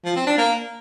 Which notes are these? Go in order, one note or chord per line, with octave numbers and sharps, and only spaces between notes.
F3
C4
D4
A#3